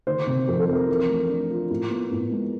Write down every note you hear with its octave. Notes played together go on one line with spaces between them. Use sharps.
D#3 C5
C3
F2 A#4
A4
F2 A#4
E3
A3
D4
F4
A2
B3
A2
G#3